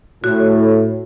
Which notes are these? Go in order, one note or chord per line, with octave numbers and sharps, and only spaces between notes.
A2 F#4